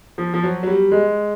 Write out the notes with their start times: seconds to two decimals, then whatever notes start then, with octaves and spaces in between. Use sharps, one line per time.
0.18 F3
0.34 F3
0.43 F#3
0.63 F#3
0.67 G3
0.92 G#3